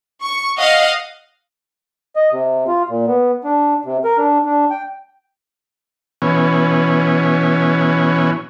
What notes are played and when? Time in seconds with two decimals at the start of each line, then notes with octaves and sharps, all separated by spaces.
0.21 C#6
0.58 D#5 F5 F#5
2.16 D#5
2.32 C3
2.67 F4
2.89 A#2
3.07 B3
3.44 D4
3.85 C3
4.04 A#4
4.18 D4
4.46 D4
4.71 G5
6.22 B2 E3 C#4